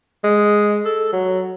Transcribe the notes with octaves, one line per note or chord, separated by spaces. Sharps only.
G#3
A4
F#3